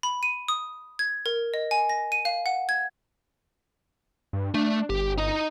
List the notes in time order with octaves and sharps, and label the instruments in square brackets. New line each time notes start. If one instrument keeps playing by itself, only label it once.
[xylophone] B5
D#7
D#6
G#6
A#4
D#5
G#5
A#6
D#7
F5
F#5
G#6
[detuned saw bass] G2
[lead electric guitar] A3 [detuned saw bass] D4
[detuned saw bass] G1 [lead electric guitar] G4
[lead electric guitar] D#4 D#5